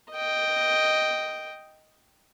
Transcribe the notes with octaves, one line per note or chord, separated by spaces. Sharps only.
D#5 G5